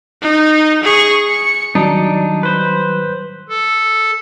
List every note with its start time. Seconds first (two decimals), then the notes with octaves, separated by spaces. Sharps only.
0.22 D#4
0.84 G#4 C#6
1.28 C#7
1.75 D#3 F#3 G3 D4 D#4
2.43 B4 C5
3.49 A4